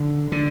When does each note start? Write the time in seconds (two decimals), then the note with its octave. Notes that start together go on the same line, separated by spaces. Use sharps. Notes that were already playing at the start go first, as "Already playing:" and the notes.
Already playing: D3
0.32 D3